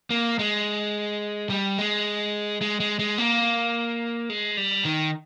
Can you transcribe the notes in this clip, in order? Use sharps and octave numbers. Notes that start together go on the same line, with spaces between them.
A#3
G#3
G3
G#3
G#3
G#3
G#3
A#3
G#3
G3
D#3